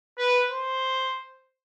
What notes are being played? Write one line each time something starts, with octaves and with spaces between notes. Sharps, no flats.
B4
C5